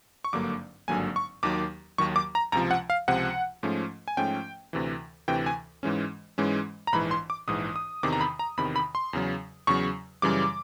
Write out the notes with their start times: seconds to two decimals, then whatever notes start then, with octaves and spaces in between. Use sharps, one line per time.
0.24 C#6
0.32 G#1 G2 D3 F#3 A#3 D6
0.88 G#1 G2 D3 F#3 A#3 G#5
1.16 C#6
1.43 D#2 D#3 F#3 D6
1.98 D#2 D#3 F#3 C#6
2.16 D6
2.35 A#5
2.52 C#2 C3 F3 A#5
2.71 F#5
2.90 F5
3.08 C#2 C3 F3 F#5
3.63 G#2 F3 A3 C#4
4.08 G#5
4.17 G#2 F3 A3 C#4 G5
4.73 D2 C3 E3
5.28 D2 C3 E3 G5
5.46 G#5
5.83 G#2 E3 G#3 C#4
6.38 G#2 E3 G#3 C#4
6.87 A#5
6.92 A#1 G#2 E3 B5
7.11 C6
7.30 D6
7.48 A#1 G#2 E3 D#6
7.76 D#6
8.03 E2 C3 D#3 D6
8.13 A#5
8.21 B5
8.39 A#5
8.57 E2 C3 D#3 B5
8.76 B5
8.95 C6
9.13 E2 C#3 F#3
9.67 E2 C#3 F#3 C#6
10.22 F#2 C#3 E3 G3 D6